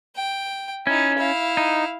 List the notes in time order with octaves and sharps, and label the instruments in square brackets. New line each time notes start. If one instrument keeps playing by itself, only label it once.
[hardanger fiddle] G5
[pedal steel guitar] C#4 [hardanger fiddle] D#4 E4
[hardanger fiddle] E4 F5
[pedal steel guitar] D#4